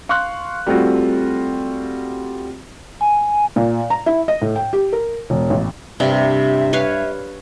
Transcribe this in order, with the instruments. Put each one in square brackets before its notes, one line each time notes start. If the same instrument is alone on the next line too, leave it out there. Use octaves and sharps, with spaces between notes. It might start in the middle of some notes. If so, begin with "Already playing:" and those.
[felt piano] F5 C6 C#6 F6 F#6
G3 A3 C4 F4 F#4
[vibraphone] G#5
[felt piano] A#2
A#5
E4
D#5
A2
G5
G4
A#4
E1
A1
[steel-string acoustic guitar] G2 [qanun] C3 [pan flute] E5
[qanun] B4 C#5 F5